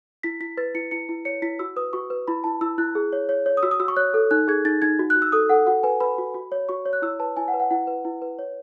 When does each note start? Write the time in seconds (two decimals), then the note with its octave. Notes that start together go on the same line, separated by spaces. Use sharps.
0.23 E4 B6
0.40 E4 B6
0.57 B4 A6
0.75 E4 C#7
0.91 E4 C#7
1.09 E4
1.25 C#5 C#7
1.42 E4 B6
1.59 F#4 E6
1.76 B4 D#6
1.93 F#4 C#6
2.10 B4
2.28 E4 B5
2.44 E4 A5
2.61 E4 E6
2.78 E4 F#6
2.95 G#4
3.13 C#5
3.29 C#5
3.46 C#5
3.57 D#6
3.63 F#4 E6
3.71 D#6
3.80 F#4 E6
3.88 C#6
3.97 C#5 F#6
4.14 A4
4.31 D#4 F#6
4.48 G#4 G#6
4.65 D#4 A6
4.82 D#4 G#6
4.99 F#4
5.10 F#6
5.16 F#4
5.22 E6
5.32 A4 D#6
5.49 A4 F#5
5.67 F#4 F#5
5.83 B4 G#5
6.00 B4 B5
6.18 F#4
6.35 F#4
6.52 C#5
6.69 F#4 C#6
6.86 C#5
6.93 F#6
7.02 E4 E6
7.19 B4 A5
7.37 E4 G#5
7.48 F#5
7.54 B4
7.60 F#5
7.71 E4 F#5
7.87 B4
8.05 E4
8.22 B4
8.39 C#5